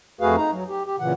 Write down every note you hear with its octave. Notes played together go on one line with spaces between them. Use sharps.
F2 A3 F#4 G#4 B4 F5
D#4 A#5
F#3
G4
G4
A#2 C#3 E3 F#5